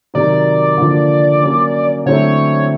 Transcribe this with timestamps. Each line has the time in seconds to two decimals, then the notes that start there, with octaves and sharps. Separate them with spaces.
0.14 C3 D#3 F#3 D5
0.78 D3 F3 A#3
1.42 F#3 A#3 C#4
2.06 D3 F#3 A3 C4 E4 C#5